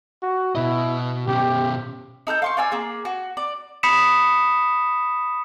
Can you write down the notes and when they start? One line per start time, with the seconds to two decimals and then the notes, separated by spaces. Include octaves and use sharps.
0.22 F#4
0.55 B2 E4 D#5
1.27 B2 C#4 G4
2.27 D#4 A4 F#6 G6
2.42 F5 C6 C#6
2.57 F4 D5 G#5 E6
2.72 A#3 G#4
3.05 F#4
3.37 D5
3.83 B5 D#6 B6 C#7 E7